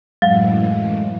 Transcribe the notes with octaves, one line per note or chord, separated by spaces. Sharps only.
F#2 A2 E3 F#3 G#3 F5